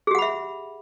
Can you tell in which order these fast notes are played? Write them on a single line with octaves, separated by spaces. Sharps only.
G#4 G4 F#5 B5 E5